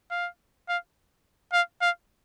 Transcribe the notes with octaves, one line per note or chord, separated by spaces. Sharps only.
F5
F5
F5
F5